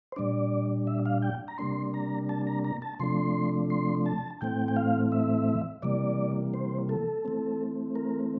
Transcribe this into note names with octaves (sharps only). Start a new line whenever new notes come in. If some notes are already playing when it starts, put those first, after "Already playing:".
C5
A#2 G3 D4 D5
E5
F5
G5
A#5
C3 G3 A#3 D4 C6
A#5
A5
A#5
A#5
A5
C3 F3 A3 D4 C6
C6
A5
A2 E3 A3 C4 G5
G5
F5
E5
C3 E3 G3 A#3 D5
C5
A4
E3 A3 C4
A#4